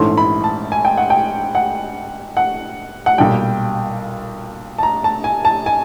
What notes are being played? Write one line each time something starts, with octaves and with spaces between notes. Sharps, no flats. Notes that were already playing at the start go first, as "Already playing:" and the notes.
Already playing: A#1 G#2 E3 A3 C#4 C6
B5
A5
G#5
G5
F#5
G5
F#5
F#5
F#5
B1 A#2 G3 G5
A5
A#5
A5
G#5
A5
G#5